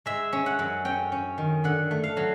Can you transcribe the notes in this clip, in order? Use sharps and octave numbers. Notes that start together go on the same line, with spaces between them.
G#3 E5
C#4
F#5
F#2
C#4 G5
C#4
D#3
D3 F#5
A3
F5
F#3